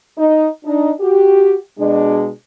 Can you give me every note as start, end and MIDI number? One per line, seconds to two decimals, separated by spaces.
0.18 0.47 63
0.65 0.91 62
0.65 0.91 63
1.00 1.55 66
1.00 1.55 67
1.79 2.28 47
1.79 2.28 56
1.79 2.28 62